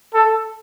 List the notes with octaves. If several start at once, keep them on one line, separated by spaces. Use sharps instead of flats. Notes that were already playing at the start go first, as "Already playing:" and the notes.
A4